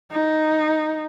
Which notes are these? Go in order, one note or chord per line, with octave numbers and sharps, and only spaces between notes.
D#4